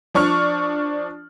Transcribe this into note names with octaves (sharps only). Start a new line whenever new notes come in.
F3 D4 C#6 F6